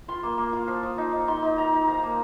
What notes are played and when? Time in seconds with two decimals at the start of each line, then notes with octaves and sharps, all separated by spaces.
0.08 F4 C6
0.23 A#3
0.38 A#3
0.53 F4
0.68 F3
0.83 F3
0.98 D#4
1.13 D#4
1.28 D#4 C6
1.42 D#4
1.58 D#4 A#5
1.73 D#4
1.88 F3 A#5
2.03 A#3